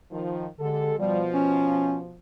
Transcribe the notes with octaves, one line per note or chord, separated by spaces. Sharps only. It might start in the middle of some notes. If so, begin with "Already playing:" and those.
D#3 F3
D3 G#3 G4 A4
B2 F3 G3
C#4